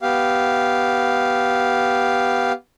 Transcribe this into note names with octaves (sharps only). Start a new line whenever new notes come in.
B3 G4 F5